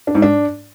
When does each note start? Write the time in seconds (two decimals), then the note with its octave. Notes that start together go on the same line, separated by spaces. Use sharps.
0.07 D4
0.15 G#2
0.22 D4